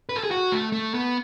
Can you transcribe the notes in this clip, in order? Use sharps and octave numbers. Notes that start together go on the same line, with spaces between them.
B4
A4
G#4
F#4
A3
A3
B3